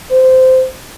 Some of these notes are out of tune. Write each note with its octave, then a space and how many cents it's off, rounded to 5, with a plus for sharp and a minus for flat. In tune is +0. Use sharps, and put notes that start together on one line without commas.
C5 -15